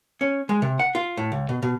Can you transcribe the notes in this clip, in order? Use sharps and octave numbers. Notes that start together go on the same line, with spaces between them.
C#4
G#3
C3
F#5
F4
A2
C#2
B2
B2